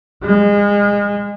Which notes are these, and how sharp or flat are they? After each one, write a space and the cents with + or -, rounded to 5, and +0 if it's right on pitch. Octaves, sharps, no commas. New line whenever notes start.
G#3 -30